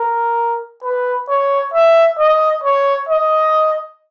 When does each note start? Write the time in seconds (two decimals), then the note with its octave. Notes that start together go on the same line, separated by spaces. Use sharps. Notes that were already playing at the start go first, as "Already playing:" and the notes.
Already playing: A#4
0.84 B4
1.29 C#5
1.74 E5
2.19 D#5
2.63 C#5
3.09 D#5